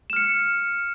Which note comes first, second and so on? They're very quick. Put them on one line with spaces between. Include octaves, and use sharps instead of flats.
E7 F6 C#7